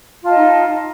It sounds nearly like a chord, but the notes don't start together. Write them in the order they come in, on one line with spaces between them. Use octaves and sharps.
F4 A5 D#5 D#4